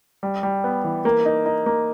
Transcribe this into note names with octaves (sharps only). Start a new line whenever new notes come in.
G3
G3
B3
E3
A#3
D#4
D#4
A#3